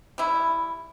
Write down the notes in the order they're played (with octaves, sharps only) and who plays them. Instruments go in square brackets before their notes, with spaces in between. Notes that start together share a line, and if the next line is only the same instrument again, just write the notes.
[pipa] G3 E4